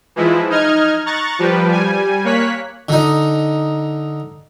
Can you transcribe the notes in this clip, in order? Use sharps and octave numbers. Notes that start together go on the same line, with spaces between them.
E3 F3 G#3 E4
D#4 D#5 F6 G#6
A#5 C#6 F#6 A6
F3 G3 G4 B4
G3 G#5
A#3 C#5 F#6 B6
D3 D#4